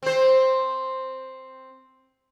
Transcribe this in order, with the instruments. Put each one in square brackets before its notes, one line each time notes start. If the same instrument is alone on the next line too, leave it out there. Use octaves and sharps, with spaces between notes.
[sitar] C4 C5